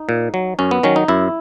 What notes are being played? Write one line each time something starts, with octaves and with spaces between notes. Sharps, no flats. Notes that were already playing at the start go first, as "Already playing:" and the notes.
Already playing: D#4
A#2
F#3
F#2 C#4
B3
D#3 F#3 C#4
D#4
F#2 E4